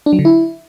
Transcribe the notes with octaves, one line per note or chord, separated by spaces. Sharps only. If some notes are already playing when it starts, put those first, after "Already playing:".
D4
F#3
D3
E4